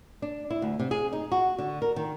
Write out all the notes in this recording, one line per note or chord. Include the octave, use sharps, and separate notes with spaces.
D4
E4
D2
C3
G#4
D#4
F#4
D3
A#4
D#3